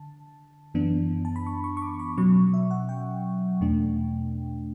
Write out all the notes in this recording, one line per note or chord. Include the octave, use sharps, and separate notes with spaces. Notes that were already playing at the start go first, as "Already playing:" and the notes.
Already playing: D3 A5
F#2 E3 B3 D4
A5
B5
C#6
C#6
C#6
D6
B5
B2 F#3 C#4 C#6
E5
F#5
G5
E2 B2 A3 D4